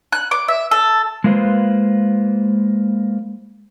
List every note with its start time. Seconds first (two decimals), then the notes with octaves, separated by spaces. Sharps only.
0.12 F#6
0.31 D6
0.48 E5
0.71 A4
1.24 G#3 A#3 F4 B4 C5